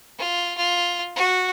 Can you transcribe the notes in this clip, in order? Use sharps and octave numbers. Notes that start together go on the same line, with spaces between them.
F4
F4
F#4